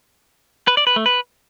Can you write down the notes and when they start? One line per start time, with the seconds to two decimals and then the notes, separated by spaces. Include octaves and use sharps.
0.68 B4
0.77 D5
0.87 B4
0.96 A3
1.06 B4